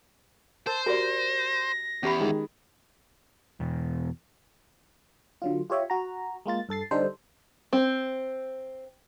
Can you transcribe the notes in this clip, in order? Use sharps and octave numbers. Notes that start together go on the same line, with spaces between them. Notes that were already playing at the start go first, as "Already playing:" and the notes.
A#4 C5 A5
F#4 G4 A#4 D5 A#6
E2 C#4 G4 B5
D#3 G#3
E2 B2
D3 F#3 F4
F4 G4 C#5 E5
F#4 A#5
G#3 A#3 F4 A6
G2 A4 A6 C7
D3 G3 D4 D#4 A4 C5
C4